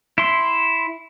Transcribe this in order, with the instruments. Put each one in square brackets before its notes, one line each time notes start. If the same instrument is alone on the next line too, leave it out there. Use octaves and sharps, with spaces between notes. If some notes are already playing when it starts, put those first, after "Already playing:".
[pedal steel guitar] E4 C6